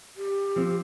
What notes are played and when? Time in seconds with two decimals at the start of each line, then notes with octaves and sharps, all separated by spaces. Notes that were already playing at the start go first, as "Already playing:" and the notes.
0.16 G4
0.56 F3 C4